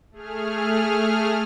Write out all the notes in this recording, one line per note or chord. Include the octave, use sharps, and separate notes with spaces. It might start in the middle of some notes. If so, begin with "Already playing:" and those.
A3 G#4 F6